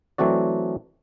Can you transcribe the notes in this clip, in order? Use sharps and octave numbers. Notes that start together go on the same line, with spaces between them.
E3 F#3 A3 C4 F#4 D5